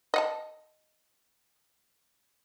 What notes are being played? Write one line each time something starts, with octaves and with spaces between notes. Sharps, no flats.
D#5 F#5 A5